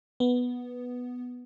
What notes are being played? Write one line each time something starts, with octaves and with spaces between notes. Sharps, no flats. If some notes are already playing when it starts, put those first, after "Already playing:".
B3